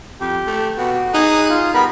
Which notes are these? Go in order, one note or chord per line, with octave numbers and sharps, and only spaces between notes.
F2 G4
A3
B2 F#4
D#4 G#4 D#6 F#6
F4
G3 B3 A#4 B5